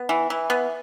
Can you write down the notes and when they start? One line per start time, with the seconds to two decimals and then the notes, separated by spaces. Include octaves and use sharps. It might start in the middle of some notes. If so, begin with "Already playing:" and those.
Already playing: B3
0.09 E3
0.30 E3
0.50 B3